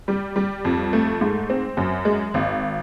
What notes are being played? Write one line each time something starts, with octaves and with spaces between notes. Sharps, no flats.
G3
G3
F2
A3
G#2
C4
F#2
G#3
G#1